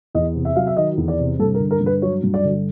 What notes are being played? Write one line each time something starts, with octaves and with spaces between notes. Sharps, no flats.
E2 D#5
C3
E5
F#3 F5
E5
D#3 D#5
E2
D5
C3
G2 A4
A#4
D3
A#4
G2
B4
F#3 C#5
G2
D5
D3